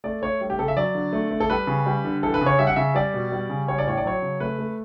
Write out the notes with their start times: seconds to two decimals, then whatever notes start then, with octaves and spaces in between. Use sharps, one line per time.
0.04 A3 D5
0.22 A3 C#5
0.41 G3
0.50 G4
0.59 C#3 A4
0.68 E5
0.77 F#3 D5
0.95 D3
1.13 A3
1.31 A3
1.40 A4
1.50 G3 B4
1.67 C#3
1.86 G3
2.05 D3
2.23 E3 A4
2.34 B4
2.41 C#3
2.46 C#5
2.59 G3 E5
2.67 F#5
2.76 C#3 E5
2.95 G3 D5
3.14 B2
3.32 G3
3.49 C#3
3.68 G3 C#5
3.78 D5
3.87 A2 C#5
3.97 D5
4.05 F#3 C#5
4.22 C#3
4.40 A3 B4
4.59 A3